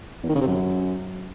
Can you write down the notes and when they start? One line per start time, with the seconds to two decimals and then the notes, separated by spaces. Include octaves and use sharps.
0.23 E2
0.29 D#3
0.35 C#3
0.41 C3
0.47 F#2